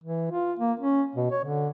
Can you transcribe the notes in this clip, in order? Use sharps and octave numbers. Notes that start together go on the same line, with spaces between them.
E3
F4
A#3
C#4
B2
C#5
D3